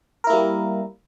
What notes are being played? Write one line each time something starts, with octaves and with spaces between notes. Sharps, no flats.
G3 A#3 E4 A#4